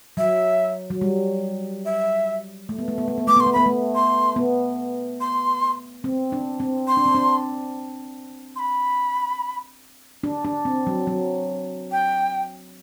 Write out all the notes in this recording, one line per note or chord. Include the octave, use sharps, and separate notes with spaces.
F#3 E5
F#3
G3
E5
A3
B3
A3
B3
A3
B3
A3 D6
B3 C6
A3
B3 B5
A3
C6
B3
C6
C4
D4
C4
C6
D4
C4
D4
C6
B5
D4
D4
C4
F#3
F#3
G5